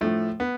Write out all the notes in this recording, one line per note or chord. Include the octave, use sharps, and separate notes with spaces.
A2 F3 A3
B3